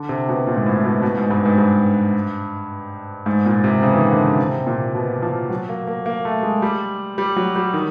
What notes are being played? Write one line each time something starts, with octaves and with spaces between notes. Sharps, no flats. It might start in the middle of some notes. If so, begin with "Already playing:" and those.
Already playing: D3
C3
B2
A#2
G#2
A2
B2
B2
G#2
G2
G#2
G2
G#2
A#2
C3
C#3
E3
D#3
D3
C#3
C3
A#2
B2
F3
F#3
A#3
A#3
A#3
A3
G#3
G3
G3
F#3
G3
D#3